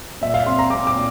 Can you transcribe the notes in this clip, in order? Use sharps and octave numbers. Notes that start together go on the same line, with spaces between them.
A#2 E5
F5
C4 C6
A#5
C4 D6
D6
A#2